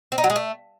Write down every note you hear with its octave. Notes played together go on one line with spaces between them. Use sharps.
C4
D#4
F#3
G#3
A3